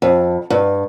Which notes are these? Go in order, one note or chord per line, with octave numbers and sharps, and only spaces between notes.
F2
G2